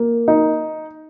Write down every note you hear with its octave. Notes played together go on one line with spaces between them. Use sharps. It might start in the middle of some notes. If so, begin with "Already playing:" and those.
Already playing: A#3
D#4